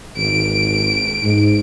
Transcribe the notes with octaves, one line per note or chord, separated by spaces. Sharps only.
G#1 D7
G#2